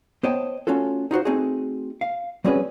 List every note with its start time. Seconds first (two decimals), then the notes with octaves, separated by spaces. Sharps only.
0.23 B3 C5 C#5 D#5 G5 A5
0.67 A3 C#4 F4 F#4 A4
1.11 D#4 F4 F#4 C5
1.25 A3 C4 D#4 F#4 G#4
2.01 F5
2.44 G3 C4 C#4 F#4 G#4 B4